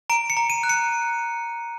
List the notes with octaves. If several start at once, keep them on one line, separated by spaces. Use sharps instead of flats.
A#5 D7
C#7
A#5
D#7
F#6
C#7